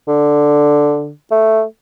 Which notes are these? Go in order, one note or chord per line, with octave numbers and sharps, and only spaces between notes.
D3
A3